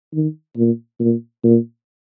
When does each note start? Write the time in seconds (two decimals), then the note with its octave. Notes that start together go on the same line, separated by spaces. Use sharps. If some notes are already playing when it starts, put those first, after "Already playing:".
0.13 D#3
0.57 A#2
0.99 A#2
1.43 A#2